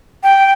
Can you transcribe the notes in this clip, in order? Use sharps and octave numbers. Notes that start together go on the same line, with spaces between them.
G5